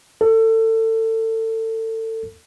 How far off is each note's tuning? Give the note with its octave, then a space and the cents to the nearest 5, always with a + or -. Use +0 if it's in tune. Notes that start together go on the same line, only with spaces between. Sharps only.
A4 +30